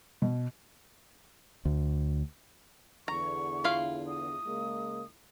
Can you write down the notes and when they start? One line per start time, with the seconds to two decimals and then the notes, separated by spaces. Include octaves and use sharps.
0.22 B2
1.65 D2
3.08 E2 D3 A#5 C#6
3.64 E4 F4 F5
4.08 D#6
4.46 C#3 G#3 A#3